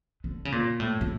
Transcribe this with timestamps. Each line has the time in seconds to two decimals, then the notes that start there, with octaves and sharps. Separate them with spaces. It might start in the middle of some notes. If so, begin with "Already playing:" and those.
0.24 D3
0.45 C#3
0.52 A#2
0.80 A2
1.01 A2